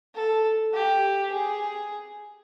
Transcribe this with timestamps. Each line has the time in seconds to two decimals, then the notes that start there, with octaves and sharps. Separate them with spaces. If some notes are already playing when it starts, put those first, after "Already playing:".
0.15 A4
0.74 G4
1.32 G#4